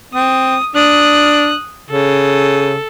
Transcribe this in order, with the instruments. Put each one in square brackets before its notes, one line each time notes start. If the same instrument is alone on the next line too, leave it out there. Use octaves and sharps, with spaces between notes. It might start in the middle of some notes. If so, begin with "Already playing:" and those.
[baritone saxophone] C4 [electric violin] D#6
[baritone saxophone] D4 [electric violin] D#6 F#6
[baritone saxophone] C#3 [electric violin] A4